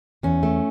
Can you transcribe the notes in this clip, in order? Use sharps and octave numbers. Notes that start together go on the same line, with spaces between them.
E2 C#4
A3